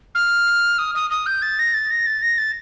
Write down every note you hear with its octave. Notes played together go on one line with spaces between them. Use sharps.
F6
D#6
D#6
D#6
G6
A6
A#6
A6
A#6
A6
A#6
A6